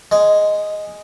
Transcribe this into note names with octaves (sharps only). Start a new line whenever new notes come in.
G#3